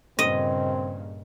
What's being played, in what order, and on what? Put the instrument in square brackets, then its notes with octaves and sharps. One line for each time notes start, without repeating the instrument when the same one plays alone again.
[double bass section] G2 A#2 C#3 [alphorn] C4 [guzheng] D#5